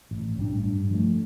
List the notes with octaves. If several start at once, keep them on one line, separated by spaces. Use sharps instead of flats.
A1
A2 G3 D4
G2
F3 A3